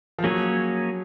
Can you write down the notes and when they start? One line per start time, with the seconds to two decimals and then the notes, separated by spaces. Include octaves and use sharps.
0.18 F3
0.24 F#3 A#3 C#4 G#4 C#5